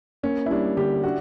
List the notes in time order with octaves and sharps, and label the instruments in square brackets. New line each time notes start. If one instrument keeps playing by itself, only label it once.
[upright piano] A#3 [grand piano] C#4
[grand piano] E4
[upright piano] G3 [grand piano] D4
[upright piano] D3 [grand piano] G4
[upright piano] D4 [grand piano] F#4